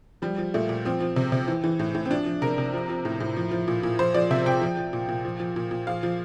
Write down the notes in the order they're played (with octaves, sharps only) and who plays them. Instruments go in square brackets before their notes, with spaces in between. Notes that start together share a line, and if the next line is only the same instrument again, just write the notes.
[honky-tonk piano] F3 G3
F3
A#2 A3
A#2
F3 C4
F3
C3
C3
E3
E3
A2
A2
C4
F3 D4
F3
C3 A#4
C3
F3
F3
A2
A2
F3
F3
A#2
A#2
F3 C5
F3 D5
C3 E5
C3 G5
F3
F3
A#2
A#2
F3
F3
A#2
A#2
F3 F5
F3